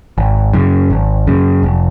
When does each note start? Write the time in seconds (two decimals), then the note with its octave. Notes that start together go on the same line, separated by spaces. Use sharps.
0.18 G#1
0.54 F#2 C#3
0.90 G#1
1.27 F#2 C#3
1.63 F1